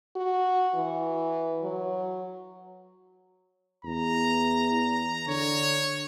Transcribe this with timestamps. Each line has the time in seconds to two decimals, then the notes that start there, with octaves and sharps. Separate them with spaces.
0.16 F#4
0.75 E3
1.63 F#3
3.85 E2 A#5
5.27 D3 C#5